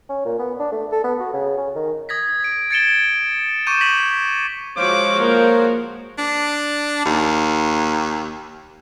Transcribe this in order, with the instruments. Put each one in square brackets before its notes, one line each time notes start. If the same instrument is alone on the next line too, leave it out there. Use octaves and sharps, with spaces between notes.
[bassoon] C#4
A#2
B3
D4
A3
A4
B3
F#4
C#3
C#4
D#3
[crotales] D#6 G#6 A#6 B6
D7
G#6 A6 C#7 D7 E7 G7
C#6 D6 G6 C#7 D#7 E7
A#6 B6 F#7
[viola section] F3 G#3 F#4 [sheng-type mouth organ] C5 C#5 F5 [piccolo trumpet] D6
[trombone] A#3 [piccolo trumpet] A#4
[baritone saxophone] D4
D#2